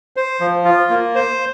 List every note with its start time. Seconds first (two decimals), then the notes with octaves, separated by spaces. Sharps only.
0.16 C5
0.40 F3
0.65 F4
0.90 A#3
1.15 C5